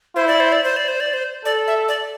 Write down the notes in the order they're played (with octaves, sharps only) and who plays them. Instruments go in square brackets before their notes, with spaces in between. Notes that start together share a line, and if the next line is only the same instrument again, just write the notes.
[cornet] E4 [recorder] C5
[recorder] D5
C5
D5
C5
D5
C5
D5
C5
[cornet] A4 [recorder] D5
[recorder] E5
D5